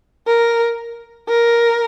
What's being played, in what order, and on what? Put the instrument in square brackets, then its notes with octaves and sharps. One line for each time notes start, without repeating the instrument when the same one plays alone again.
[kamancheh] A#4
A#4